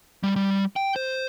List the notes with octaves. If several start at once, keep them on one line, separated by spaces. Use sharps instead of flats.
G3
G3
G5
C5